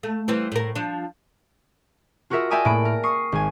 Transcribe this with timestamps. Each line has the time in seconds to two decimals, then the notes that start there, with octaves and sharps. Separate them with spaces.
0.03 A3
0.28 E3 G3 C4
0.52 A2 A#4
0.75 F3 D4
2.30 F4 F#4 G#4 A#4 E5
2.50 D5 E5 G5 G#5 A#5 D#6
2.65 A2 A#3 B5 D7
2.85 A#4
3.03 C#6 D#6 C7
3.32 G#1 G#5